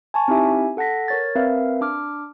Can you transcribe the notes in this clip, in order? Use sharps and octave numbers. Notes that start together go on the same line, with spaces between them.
G#5 A5 C#6
C4 D#4 E4 G4 E5 G#5
A4 F#5 A5 A#6 B6
A#4 C#5 A6
C4 A#4 B4 E5 F5
D4 D6 F6